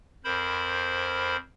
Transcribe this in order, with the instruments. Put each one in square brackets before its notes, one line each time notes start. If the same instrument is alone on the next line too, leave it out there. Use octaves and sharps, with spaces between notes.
[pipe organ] F2 A#4 C5 B5